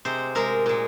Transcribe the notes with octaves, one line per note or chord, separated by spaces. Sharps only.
C3 G#3 C5
C3 G#3 A#4
A#2 G#3